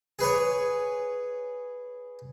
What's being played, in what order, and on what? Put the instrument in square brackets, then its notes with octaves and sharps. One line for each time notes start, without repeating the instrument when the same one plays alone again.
[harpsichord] G#4 B4 C#5